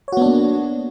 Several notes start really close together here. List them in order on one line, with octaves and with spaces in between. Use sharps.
C#5 F#4 B3 D4 A#3